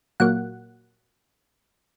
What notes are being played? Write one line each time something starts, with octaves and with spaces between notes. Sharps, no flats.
A#2 F#3 A#3 F#5